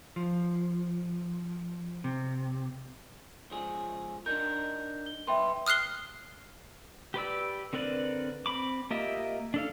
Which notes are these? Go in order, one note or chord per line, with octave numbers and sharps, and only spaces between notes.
F3
C3
C#2 F3 G#4
D4 D#4 A#4 G6
G7
B1 B3 B4 E5 G5 C6
D#6 F6 F#6 C7 G7
G4 B4 D5 E6
D3 C4 A#4 B4 D5
C4 B5 D6
A#3 F4 G4 D#5 E5
D4 A4 F5